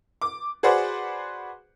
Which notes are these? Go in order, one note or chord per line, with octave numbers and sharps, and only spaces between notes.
D6
F#4 G#4 B4 C5 D5 F#5